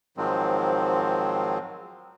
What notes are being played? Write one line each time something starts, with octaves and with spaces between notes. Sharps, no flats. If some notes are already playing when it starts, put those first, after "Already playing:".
G#2 D#3 F3 F#3 G#3 C4